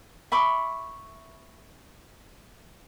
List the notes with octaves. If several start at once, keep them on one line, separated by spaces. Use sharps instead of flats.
E5 B5 C#6 D6